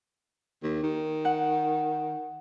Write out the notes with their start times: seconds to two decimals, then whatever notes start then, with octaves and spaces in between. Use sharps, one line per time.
0.63 D#2
0.83 D#3
1.25 F#5